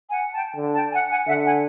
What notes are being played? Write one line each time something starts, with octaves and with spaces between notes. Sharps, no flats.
F#5 G#5
G5 A5
D3
G5 A5
F#5 G#5
F#5 G#5
D3 E5 F#5
F#5 G#5